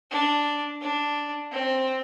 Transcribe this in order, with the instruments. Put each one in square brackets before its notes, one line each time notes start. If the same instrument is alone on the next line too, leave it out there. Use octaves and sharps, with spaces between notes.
[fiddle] D4
D4
C4